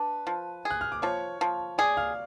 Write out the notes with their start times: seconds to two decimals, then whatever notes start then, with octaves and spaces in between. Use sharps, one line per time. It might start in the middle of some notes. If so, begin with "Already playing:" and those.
Already playing: D4 B4
0.27 F3
0.65 G#4
0.70 F#6
0.81 F6
0.92 D6
1.02 F3 C#5 C#6
1.41 F3
1.78 G#4 D5 D6
1.97 F5 F6